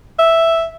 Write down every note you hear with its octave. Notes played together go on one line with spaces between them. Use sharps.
E5